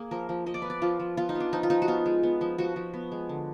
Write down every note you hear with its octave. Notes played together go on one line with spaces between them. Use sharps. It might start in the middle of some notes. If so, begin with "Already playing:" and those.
Already playing: A#3 G#4
F3 A#4
F3
F3 D#5
D5
B3 B4
D5
F3 F4
F3
B3 F4
D#4
B3
D4
F3 D#4
F4
F3 D#4
F#4
B3 F4
G#3
B3
F3
F3 F#4
F3
B3
G#3
D3